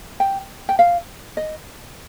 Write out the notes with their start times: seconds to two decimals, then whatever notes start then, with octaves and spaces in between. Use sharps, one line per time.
0.20 G5
0.69 G5
0.79 F5
1.37 D#5